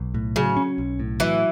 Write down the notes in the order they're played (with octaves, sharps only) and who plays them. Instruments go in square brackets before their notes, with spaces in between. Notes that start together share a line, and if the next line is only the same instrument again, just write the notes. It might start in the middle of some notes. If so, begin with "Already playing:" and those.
Already playing: [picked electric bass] B1
A2
[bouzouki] C#3 [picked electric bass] F#3
[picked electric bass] C#4
B1
A2
[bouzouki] E3 [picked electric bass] F#3